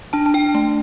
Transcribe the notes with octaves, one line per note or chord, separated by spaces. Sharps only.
D4 A5
A5
D4 G5
A3